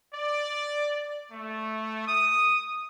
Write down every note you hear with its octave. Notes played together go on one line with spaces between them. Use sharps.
D5
A3
D#6